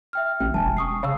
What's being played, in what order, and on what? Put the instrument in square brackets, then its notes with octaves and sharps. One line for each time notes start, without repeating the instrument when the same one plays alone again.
[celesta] E5 G5 F6
[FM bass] A1 [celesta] G5
[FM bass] E1 [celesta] G#5 A5
[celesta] C#6 D#6 C7
[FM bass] C#3 [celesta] D#6 E6